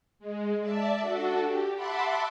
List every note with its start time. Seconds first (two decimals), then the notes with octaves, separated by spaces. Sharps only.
0.19 G#3
0.60 D5 E5 A5
1.00 D4 F#4 A4
1.42 G4
1.75 E5 F#5 A5 B5 C6 D6